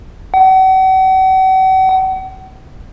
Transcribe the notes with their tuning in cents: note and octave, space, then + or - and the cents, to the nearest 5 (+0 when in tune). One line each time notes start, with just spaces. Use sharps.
F#5 +40